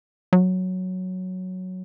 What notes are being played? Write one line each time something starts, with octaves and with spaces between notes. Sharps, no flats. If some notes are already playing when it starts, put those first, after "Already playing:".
F#3